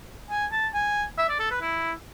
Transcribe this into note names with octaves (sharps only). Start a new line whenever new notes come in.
G#5
A5
G#5
E5
D5
A4
B4
E4